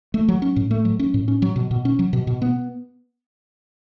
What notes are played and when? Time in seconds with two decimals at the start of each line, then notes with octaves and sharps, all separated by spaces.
0.14 A3
0.28 F#3
0.42 C#4
0.56 A2
0.71 A3
0.85 F#3
0.99 C#4
1.14 A2
1.28 C#4
1.42 F#3
1.56 B2
1.71 B2
1.85 C#4
1.99 F#3
2.13 B2
2.27 B2
2.42 B3